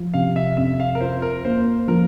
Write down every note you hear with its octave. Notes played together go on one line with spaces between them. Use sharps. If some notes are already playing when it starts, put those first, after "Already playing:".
Already playing: F3
C3 F5
E5
F2 E5
F5
A#4
F4 C5
A#4
A#3 C5
F3 A#4